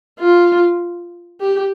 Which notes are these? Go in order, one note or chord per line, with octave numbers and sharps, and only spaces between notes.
F4
G4